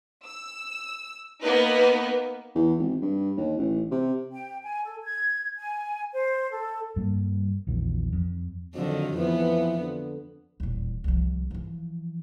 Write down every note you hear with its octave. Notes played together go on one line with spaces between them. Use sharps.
E6
A#3 B3 D#4 B4
E2
G#1
G2
D#2
A1
C3
G5
G#5
A4
G#6
G#5
C5
A4
G2 G3 A#3
A#1 E2 D#3 F3
F2
F2 D3 D#3 F#3
F2 E3 F3 B3
D3
D#1 E2
C2 F3
E3 F3